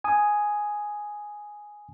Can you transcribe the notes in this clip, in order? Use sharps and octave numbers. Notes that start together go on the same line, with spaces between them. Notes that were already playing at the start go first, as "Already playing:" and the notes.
G#5 D#6